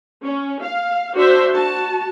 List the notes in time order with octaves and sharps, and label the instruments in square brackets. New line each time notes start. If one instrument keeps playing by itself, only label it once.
[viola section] C#4
F5
D4 F#4 C5 E5
F#4 A5